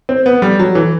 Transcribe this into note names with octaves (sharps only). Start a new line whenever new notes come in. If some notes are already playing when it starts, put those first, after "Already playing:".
C4
B3
G3
F#3
E3